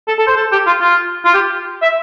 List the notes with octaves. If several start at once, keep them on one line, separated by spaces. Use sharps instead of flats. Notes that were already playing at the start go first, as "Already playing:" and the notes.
A4
A4
C5
A4
G4
F4
F4
F4
G4
E5